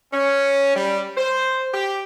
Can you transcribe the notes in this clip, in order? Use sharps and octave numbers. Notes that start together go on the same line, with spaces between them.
C#4
G3
C5
G4